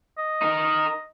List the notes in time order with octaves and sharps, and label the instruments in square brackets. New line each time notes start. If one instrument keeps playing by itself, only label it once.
[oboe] D#5
[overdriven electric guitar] D#4 A#4